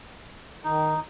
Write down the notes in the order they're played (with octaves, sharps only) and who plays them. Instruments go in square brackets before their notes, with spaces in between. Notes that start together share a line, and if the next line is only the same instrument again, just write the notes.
[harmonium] D#3 [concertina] D#4